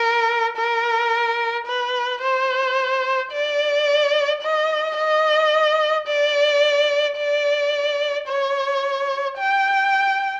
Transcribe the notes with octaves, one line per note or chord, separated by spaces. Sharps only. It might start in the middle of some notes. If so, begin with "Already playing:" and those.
Already playing: A#4
A#4
B4
C5
D5
D#5
D#5
D5
D5
C#5
G5